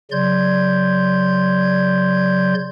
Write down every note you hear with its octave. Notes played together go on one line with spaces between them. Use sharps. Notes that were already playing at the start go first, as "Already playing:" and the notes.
C#3 F#3 D5 C6 G6 G#6